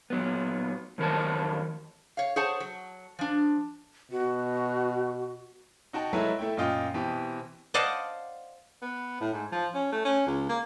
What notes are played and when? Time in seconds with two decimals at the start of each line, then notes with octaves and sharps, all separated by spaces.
0.10 A#2 F#3 B3
0.98 F2 D#3 F#3 A#4 C5 A5
2.17 C#5 F5
2.36 G#4 C5 C#5 F#5 A5
2.60 F#3
3.19 F3 D4
4.12 B2 F#4
5.93 D#4 F#4 G5 A5
6.13 F#3 G#3 A3 E4 A#4 B4
6.39 A3 E4 G5
6.57 F#2 A#2 F4 D#5 G5
6.94 B2 E3 C4 G4
7.74 C5 D5 D#5 F5 F#5 A5
8.82 B3
9.21 A2
9.33 G#2
9.52 F3
9.75 C#4
9.92 A3
10.05 C#4
10.27 C#2
10.49 A#3